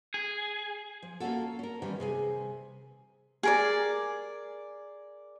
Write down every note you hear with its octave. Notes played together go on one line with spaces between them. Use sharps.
G#4
F3
A#3 C#4 D#4 F4 F#4 A4
C#4 A#4
D#3 E3 G3 C#4 C5
C3 G#4 G#5
G#4 A#4 D5